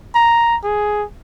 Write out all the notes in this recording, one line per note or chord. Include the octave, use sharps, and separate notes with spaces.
A#5
G#4